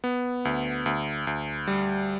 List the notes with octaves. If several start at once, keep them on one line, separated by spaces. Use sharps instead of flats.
B3
D2
D2
D2
G3